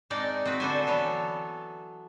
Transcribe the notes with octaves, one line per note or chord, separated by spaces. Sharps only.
G#3 C4 D4 D#4 D5 F#5
C4 F#4 B4
D3 B3 D4 A4 C5 G#5
E3 F#3 B3 A4